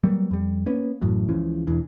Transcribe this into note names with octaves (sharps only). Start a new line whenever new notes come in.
F#3 G3 A#3 B3
F2 G3
A#3 B3 C#4
A1 F#2 A2 F#3
C#2 C#3 E3 F3
E1 E2 E3 D4